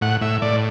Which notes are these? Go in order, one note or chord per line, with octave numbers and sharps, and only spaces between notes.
A2 F#5
A2 E5
A2 D5